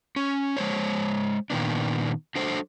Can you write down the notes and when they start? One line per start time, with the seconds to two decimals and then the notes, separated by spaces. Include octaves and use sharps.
0.16 C#4
0.57 G#3 C5 C#5
1.50 A#2 D#3 B3 D4
2.35 F#3 D4 A4 C5